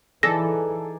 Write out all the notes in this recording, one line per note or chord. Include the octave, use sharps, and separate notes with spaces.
E3 D#4 G#4 A4 D5 A#6